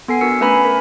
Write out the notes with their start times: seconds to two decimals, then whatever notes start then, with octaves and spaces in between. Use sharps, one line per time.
0.08 B3 A4 G#5 C7
0.21 D4 F#4 A#4 E6 C#7
0.41 A3 C#4 B4 G#5 A#5 B5
0.65 A#4